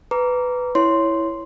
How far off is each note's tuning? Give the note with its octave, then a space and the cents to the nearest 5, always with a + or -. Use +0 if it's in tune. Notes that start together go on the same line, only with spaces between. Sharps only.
B4 +10 A#5 +0 D6 -25
E4 +0 C#5 +0 C6 +0